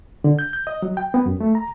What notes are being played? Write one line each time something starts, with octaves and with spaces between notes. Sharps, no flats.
D3
G6
G6
D#5
F#3
G5
B3
F#2
A3
A#5